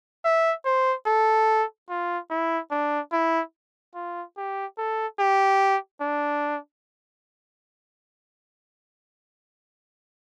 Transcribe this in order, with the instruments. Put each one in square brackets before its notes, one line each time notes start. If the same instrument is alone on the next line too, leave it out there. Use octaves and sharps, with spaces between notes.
[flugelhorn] E5
C5
A4
F4
E4
D4
E4
F4
G4
A4
G4
D4